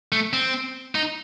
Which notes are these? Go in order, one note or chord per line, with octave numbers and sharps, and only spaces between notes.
A3
C4
D#4